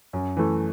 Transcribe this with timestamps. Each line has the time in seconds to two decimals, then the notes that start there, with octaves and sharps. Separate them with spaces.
0.13 F#2
0.37 E3 A3